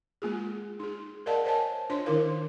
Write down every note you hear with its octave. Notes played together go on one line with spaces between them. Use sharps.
G#3 A#3 F4 G#4
D#4 G#4
A#4 D5 D#5 F5 F#5 A5
A#4 C5 C#5 D#5 G#5 A5
D4 F4 C5 C#5 C6
D#3 D#4 E4 A#4 F5